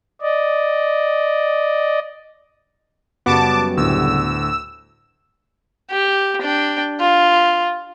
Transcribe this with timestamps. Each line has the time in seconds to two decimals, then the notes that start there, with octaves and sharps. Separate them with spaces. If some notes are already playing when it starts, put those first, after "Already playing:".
0.22 D5 D#5
3.26 F#2 C#3 G3 B3 F#4 A5 D6
3.77 D2 A2 E6
5.90 G4
6.41 D4 G5
7.00 F4